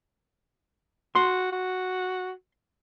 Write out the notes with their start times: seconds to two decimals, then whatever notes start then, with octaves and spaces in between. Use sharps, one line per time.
1.15 F#4 C6
1.52 F#4